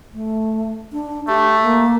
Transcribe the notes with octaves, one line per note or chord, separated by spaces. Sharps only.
A3
D4
A3 G4
A#3